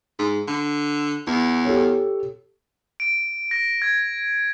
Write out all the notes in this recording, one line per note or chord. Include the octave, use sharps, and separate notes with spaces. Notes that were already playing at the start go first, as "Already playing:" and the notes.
G#2
D3
E2
G4 A4 C#5
D7
A#6
G#6